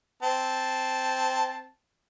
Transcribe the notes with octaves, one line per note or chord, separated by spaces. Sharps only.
C4 A5